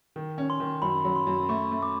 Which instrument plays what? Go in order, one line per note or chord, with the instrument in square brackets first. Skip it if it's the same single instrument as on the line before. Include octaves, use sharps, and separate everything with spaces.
[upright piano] D#3
C#4
[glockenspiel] C6
[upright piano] D#3
[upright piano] F#2 [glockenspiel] B5
[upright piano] F#3
[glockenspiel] C6
[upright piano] F#2
[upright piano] A3 [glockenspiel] C#6
[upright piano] A3
[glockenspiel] D6